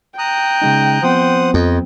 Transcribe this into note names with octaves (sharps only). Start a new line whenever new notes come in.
G5 A#5 D#6 F#6
C#3 G#3 D#4
F3 B3 C4 C5 F#5 D#6
F2 D#5